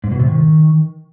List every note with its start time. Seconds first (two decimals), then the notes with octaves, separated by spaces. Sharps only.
0.04 G#2
0.12 B2
0.20 C3
0.27 D#3